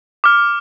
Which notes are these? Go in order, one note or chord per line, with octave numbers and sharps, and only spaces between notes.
D6 F6